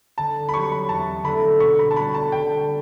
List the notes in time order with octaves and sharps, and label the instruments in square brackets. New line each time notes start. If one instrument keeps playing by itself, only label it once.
[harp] D3 [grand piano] A5
[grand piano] B5
[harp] F#3 C#4 G4 C#5 [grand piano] C#6
[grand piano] B5
[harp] E2 [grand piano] A5
[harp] D3 A3 D4 A4 [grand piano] B5
[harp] B2 [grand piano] C#6
[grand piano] B5
A5
[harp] G3 C#4 F#4 [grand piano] B5
[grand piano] A5
[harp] D3 [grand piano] G5